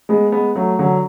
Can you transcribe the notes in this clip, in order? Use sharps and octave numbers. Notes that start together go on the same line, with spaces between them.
G#3 B3
G#3 B3
F#3 A3
D3 F#3